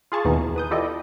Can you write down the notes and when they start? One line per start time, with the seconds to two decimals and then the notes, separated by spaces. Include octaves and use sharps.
0.12 F4 G#4 A5 C#6
0.25 D#2 B2 E3 B3 D#4
0.56 B4 D#6 G6
0.71 E4 F4 G4 A4 D5 D#5